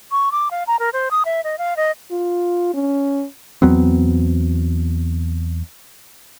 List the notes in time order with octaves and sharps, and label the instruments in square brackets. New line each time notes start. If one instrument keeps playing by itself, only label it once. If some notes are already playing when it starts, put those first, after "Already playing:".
[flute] C#6
D6
F5
A#5
A#4
C5
D#6
E5
D#5
F5
D#5
[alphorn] F4
C#4
[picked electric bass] E2 F#3 B3 C4